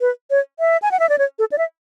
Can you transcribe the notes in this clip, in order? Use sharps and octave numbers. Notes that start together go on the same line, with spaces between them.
B4
C#5
E5
G#5
F#5
E5
D5
C#5
A4
D5
E5